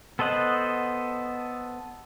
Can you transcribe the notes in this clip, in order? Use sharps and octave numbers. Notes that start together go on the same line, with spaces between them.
B3 A4 C5 D#5 F#5